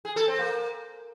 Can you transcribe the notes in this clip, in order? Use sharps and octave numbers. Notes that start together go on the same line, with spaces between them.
G#4
A4
C4
A#3